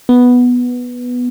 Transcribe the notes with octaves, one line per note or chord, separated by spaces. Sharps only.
B3